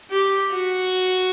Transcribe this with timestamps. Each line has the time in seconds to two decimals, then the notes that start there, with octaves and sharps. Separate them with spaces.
0.11 G4
0.52 F#4